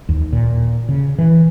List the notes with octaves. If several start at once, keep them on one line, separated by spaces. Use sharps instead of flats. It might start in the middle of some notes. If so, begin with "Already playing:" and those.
D#2
A#2
C#3
E3